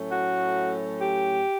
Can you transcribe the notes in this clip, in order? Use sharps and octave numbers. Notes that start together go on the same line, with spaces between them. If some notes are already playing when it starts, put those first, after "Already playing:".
Already playing: A2 F#3 A3 C#4
F#4
G4